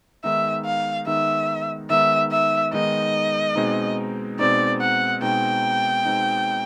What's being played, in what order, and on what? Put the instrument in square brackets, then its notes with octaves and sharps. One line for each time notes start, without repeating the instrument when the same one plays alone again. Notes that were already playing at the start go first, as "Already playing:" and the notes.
[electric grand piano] D#3 G#3 B3 D#4 [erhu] E5
[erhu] F5
[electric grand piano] D#3 G#3 B3 D#4 [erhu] E5
[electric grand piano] D#3 G#3 B3 D#4 [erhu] E5
[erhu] E5
[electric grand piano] D#3 G#3 B3 D#4 [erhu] D#5
[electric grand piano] B2 G#3 C4 D#4
[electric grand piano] B2 G#3 C4 D#4 [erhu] D5
[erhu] F#5
[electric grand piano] B2 G#3 C4 D#4 [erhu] G5
[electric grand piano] B2 G#3 C4 D#4